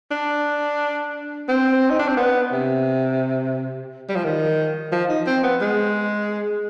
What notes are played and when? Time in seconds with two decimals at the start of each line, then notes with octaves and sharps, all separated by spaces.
0.11 D4
1.49 C4
1.90 D#4
1.99 D4
2.08 C4
2.17 B3
2.52 C3
4.09 G3
4.16 F3
4.24 D#3
4.92 F3
5.10 D#4
5.27 C4
5.44 B3
5.61 G#3